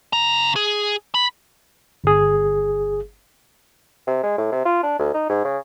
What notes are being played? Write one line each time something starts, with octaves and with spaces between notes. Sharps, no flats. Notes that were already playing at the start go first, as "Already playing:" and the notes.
C#3 A#5
G#4
B5
G1 G#4
C3
G#3
A2
C3
F4
D4
D2
D#4
G#2
C#3